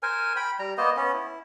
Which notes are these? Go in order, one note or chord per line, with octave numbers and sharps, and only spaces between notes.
A#4 C5 G#5
G5 B5
G3 A#5
A#3 B3 C5 D#5
B3 C#4
E4